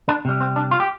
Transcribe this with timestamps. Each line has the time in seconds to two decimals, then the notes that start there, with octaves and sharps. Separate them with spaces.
0.09 D4
0.25 C3 G3
0.41 C4
0.56 D4
0.71 F4
0.80 G4